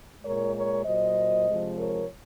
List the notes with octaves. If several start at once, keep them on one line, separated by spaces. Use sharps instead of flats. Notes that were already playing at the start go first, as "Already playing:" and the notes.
A#2 G#3 A#4 C#5
A#4 C#5
A#2 F#3 C5 D#5
C3 F3 G#3
A#4 C#5